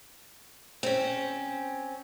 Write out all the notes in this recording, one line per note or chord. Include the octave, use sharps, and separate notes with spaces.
C4 C#4